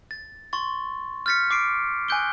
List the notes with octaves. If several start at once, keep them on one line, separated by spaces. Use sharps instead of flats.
A6
C6 C#6 A6
F6 G6 A6 B6 C#7
D6 C7 D7
G#5 D#6 F#6 G6 D7 G7